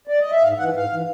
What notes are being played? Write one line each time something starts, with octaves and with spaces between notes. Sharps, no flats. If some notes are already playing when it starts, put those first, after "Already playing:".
D5
D#5
E5
G#2 F5
E3 F#5
G#2 F5
E3